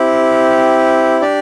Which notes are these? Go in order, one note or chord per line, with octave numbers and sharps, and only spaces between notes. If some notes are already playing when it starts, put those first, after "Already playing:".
Already playing: C4 E4 G4
D4 G4 D5